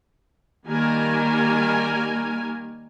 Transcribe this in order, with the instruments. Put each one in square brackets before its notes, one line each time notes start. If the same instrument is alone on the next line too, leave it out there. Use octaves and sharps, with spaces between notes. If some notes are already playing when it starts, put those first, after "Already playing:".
[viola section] D#3 G3 A#3 A#4 G#5